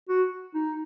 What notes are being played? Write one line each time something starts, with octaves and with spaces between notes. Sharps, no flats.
F#4
D#4